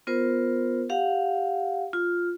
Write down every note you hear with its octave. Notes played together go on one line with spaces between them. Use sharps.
B3 F4 A#4 C5
G4 F5 F#5
F4